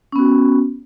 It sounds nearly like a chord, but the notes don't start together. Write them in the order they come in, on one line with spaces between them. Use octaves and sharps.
C#4 B3 F#4